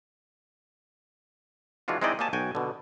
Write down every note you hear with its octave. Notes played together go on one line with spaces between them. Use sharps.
E3 G#3 D4 F4 F#4
G#3 C4 D#4 E4 D5 D#5
A#3 G4 C#5 G#5 A5
B1 F#4 G5 G#5
B2 D3